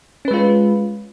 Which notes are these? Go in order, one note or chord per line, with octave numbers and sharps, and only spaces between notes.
G#3 C#4 F4 B4